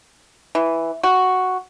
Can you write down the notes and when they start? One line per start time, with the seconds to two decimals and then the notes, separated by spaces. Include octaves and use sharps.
0.55 E3
1.03 F#4